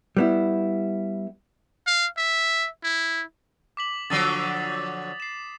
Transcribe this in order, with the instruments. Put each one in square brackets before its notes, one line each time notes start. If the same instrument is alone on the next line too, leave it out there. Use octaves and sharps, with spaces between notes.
[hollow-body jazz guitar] G3 B3 E4
[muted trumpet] F5
E5
E4
[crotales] D6 B6 F#7
[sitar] D3 F3 F#3 [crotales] D#6 A6
[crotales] C7 E7